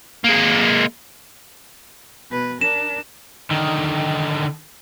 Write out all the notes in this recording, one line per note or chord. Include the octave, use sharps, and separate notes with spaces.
G#3 A#3
B2 B4
D4 A#4 E7
D3 D#3